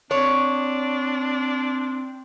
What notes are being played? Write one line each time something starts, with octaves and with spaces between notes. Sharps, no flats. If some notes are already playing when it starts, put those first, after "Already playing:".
C4 D4 C#5